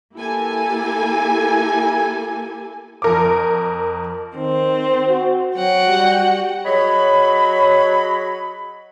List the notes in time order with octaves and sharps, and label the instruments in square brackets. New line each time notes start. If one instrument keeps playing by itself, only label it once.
[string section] A#3 E4 G4 A4 G#5
[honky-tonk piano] F2 A#4 D6
[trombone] D#3 [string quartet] C4
[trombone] F#4
[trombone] F#3 [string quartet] F#4 F#5 G5
[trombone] G3
[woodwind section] F#3 G#4 C#5 D#5 B5